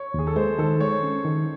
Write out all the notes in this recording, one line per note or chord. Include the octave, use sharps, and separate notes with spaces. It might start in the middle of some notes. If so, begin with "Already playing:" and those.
Already playing: C#5
D#2 G#4
A4
G#3 C5
D#3 A4
G#3 C#5
C#4
D#3